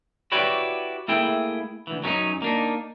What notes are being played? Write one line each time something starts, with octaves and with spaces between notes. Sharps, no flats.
E4 F#4 G4 B4 C#5 D5
A3 A#3 E4 G#4 G5
D2 E3
F#2 F#3 G#3 B3 C#4 D#4
A#3 D4 D#4